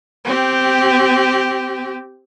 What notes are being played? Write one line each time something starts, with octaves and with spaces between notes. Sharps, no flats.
C4 G4